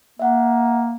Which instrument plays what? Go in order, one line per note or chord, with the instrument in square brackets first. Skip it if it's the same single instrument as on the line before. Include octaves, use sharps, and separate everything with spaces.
[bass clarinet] A#3 [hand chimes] E5 F#5